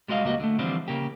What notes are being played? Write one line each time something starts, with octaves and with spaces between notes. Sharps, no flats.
G3 G#3 F#4 D#5 F5
C#2 G3 A#3 F#4 D#5
D3 A3
D3 E3 F3 G3 C4 D4
C#3 A#3 G4